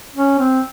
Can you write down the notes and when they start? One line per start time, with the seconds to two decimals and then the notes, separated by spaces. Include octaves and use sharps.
0.16 C#4
0.39 C4